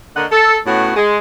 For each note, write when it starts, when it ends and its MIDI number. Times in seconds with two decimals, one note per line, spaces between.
0.16 0.25 50
0.16 0.25 58
0.16 0.25 70
0.16 0.25 73
0.16 0.25 75
0.16 0.25 78
0.31 0.56 69
0.66 0.95 45
0.66 0.95 59
0.66 0.95 61
0.66 0.95 66
0.96 1.18 56